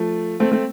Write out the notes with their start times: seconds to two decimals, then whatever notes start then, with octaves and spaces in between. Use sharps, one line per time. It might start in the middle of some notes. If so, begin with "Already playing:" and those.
Already playing: F3 A3
0.40 A3 C4
0.52 A3 C4